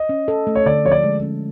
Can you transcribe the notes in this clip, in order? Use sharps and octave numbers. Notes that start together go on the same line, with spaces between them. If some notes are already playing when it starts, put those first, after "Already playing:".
Already playing: D#5
C#4
A4
A3
C#5
D3 D5
F3 C#5
D5
G#3
C#4